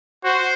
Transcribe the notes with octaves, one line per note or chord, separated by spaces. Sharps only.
F#4 C5